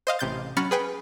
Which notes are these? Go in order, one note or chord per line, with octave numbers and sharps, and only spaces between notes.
C5 D#5 F5
A1 C3 G6 A6
F#3 C#4 B5 F6 A6 C#7
G#4 B4 G5 G#5